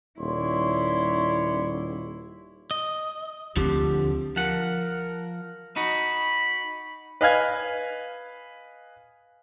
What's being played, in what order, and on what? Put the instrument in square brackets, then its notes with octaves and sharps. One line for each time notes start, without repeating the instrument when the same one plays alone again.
[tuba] D#1 [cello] E4 [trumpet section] C#5 D5 C6
[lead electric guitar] D#5
[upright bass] D2 C4 [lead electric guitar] D3 F3 [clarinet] G4
[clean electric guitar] F3 F#5 [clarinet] A#4
[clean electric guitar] D#4 F#4 [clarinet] B5
[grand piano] B4 D#5 F5 G#5 F6 G#6